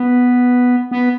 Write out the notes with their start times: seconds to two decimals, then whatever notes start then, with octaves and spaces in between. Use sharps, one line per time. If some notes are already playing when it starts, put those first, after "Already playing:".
Already playing: B3
0.91 B3